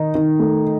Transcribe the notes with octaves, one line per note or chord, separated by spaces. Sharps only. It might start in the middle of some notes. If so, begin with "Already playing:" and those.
Already playing: D#3 D#4
D#3
A3